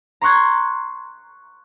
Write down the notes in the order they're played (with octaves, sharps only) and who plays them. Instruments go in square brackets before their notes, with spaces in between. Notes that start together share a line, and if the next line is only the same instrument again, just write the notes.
[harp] A#5 C6 C#6 F#6 G#6